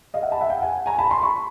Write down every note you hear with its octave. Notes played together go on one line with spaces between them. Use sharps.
D#5 F5
E5 F#5
A5 B5
E5 F#5
F5 G5
F#5 G#5
G#5 A#5
A5 B5
A#5 C6
B5 C#6